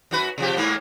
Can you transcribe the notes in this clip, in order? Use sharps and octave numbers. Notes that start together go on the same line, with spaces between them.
F#2 F#4 B4
C3 F3 G4
G#2 A#3 B3